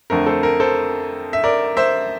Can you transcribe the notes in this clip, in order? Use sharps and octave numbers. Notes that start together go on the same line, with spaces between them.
F2 D3 A3 C4 A#4
A4 C5
A#4
A4 C5
E5
A#4 D5
C5 E5